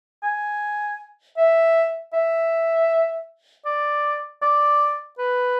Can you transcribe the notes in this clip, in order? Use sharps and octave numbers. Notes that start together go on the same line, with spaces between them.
G#5
E5
E5
D5
D5
B4